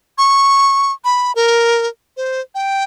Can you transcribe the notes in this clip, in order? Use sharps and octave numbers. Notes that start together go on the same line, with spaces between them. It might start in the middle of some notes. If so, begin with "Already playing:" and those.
C#6
B5
A#4
C5
G5